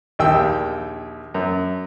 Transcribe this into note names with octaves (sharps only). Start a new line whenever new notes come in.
A#1 D#2 G5 E6
F#2